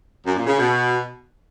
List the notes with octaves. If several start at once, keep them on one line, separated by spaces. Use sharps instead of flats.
F#2
A#2
C#3
B2